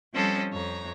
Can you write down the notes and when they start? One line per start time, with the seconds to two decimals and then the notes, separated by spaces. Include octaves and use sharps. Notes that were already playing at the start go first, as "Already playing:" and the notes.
0.13 F3 G3 C4 C#4 A4 D#5
0.51 F2 C#5 A#5